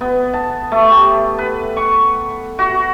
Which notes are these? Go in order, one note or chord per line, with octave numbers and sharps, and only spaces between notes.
B3
A5
A3
G4
B4
C#6
F#4